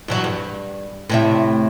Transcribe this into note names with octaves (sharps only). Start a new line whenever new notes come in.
G2 E3 F#3
G2
A2 C3 E5